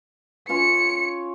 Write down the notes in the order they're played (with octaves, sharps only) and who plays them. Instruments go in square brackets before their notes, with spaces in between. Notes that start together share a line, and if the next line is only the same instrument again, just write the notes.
[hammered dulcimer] C#4 F4 C#5 [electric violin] C#7